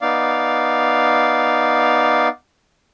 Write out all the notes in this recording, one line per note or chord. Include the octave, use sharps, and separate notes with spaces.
B3 D#4 D5 F5